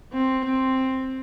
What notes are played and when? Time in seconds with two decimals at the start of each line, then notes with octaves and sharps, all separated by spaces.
0.12 C4
0.45 C4